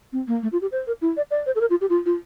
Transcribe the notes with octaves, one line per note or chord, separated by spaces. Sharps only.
C4
A#3
A3
F4
G4
C5
A#4
E4
D5
D5
C5
A4
A#4
F4
G4
F4
F4